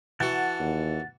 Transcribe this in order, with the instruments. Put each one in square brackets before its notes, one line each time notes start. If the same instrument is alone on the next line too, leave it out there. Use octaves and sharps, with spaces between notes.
[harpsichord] E3 F#4 [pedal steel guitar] F#5 A5
[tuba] D#2